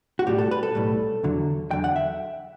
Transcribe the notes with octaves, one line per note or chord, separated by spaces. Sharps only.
F#4
B1 A2 G3 G4
A4
B4
A4
B1 A2 G3
E2 D3 F#3
E2 D3 F#3 G5
F#5
E5